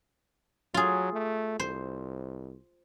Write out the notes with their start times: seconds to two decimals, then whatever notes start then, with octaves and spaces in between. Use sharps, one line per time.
0.74 F#3 F4 G#4
1.13 A3
1.60 C2 C5